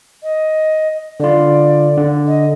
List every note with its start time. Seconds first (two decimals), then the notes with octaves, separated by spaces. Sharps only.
0.23 D#5
1.20 D3 F4 D5
1.97 D3
2.27 D#5